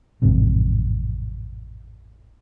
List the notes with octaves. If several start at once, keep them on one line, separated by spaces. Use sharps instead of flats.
A1 F2 G#2 C3